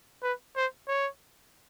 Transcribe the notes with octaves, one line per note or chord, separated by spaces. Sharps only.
B4
C5
C#5